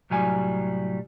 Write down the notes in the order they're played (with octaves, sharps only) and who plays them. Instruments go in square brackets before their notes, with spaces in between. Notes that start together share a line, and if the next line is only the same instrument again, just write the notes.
[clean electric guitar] C2 A2 F#3 G3 G#5